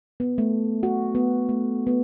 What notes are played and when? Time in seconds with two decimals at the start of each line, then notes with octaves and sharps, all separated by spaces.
0.20 B3
0.38 A3
0.83 F#4
1.15 B3
1.49 A3
1.87 B3